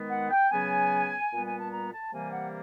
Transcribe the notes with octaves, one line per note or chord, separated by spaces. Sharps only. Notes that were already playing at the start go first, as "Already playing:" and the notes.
Already playing: D#3 G#3 B3
F#5
G5
C#3 F#3 B3 G#5
A#2 G3 B3
G#5
A5
A#5
A5
C3 E3 G3 A#3 G#5
F#5